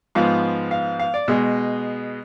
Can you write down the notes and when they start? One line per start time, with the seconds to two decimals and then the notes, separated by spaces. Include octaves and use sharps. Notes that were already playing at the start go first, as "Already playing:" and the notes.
0.15 G#2 F3 B3 F5
0.71 F5
0.99 F5
1.14 D5
1.28 B2 G#3